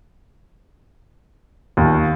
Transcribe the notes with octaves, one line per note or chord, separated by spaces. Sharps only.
D#2